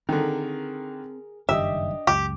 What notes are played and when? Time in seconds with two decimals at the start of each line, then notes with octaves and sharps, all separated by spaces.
0.09 D3 D#3 C4 G#4 A#4
1.49 F#1 G2 D#3 D4 G4 D#5 E5
2.07 C#2 F#2 G4